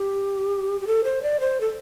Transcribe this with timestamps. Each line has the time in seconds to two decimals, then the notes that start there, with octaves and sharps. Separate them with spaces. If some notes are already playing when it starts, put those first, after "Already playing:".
Already playing: G4
0.81 G4
0.87 A4
1.04 C5
1.23 D5
1.40 C5
1.61 A4